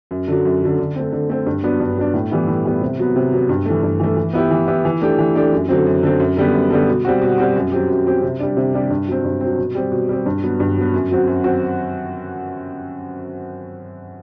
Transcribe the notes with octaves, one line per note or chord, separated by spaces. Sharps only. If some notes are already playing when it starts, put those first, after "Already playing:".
F#2
D3 F#3
F#2
D3 F#3
D3
A3 C4
D3
A3 C4
G2
F#3 B3 D4
G2
F#3 B3 D4
A2
E3 G3 B3 E4
A2
E3 G3 B3 E4
C3
F#3 B3
C3
F#3 B3
G2
E3 A3
G2
E3 A3
E3
B3 E4 G4
E3
B3 E4 G4
E3
A3 D4 G4
E3
A3 D4 G4
F#2
D3 F#3 C4
F#2
D3 F#3 C4
F#2
D3 G3 B3
F#2
D3 G3 B3
B2
G3 C4 F#4
B2
G3 C4 F#4
F#2
F#3 C4 G4
F#2
F#3 C4 G4
C3
G3 D4
C3
G3 D4
G2
F#3 C4
G2
F#3 C4
B2
G3 C4
B2
G3 C4
G2
F#3 B3
G2
F#3 B3
F#2
F#3 C4 F#4
F#2
F#3 C4 F#4